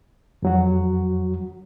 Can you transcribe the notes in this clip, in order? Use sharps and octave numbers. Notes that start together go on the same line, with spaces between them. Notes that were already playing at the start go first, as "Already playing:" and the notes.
F2 F#3 F#4